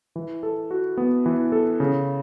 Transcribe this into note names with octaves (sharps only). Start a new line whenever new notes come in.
E3
A4
F#4
B3
E3
A4
C#3